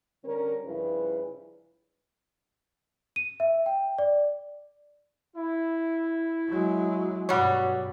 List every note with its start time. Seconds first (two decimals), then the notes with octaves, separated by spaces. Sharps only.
0.25 D3 G3 C#4 A#4
0.64 G2 C#3 F3 E4 B4
3.16 D#7
3.40 E5
3.66 G5
3.99 D5
5.35 E4
6.48 F#3 G#3
7.29 G2 B2 F#3 G3 C#5 F#5 D6